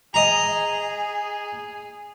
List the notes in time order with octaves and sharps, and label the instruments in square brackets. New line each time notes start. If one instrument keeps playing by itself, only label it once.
[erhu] G#4 [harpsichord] D#5 A#5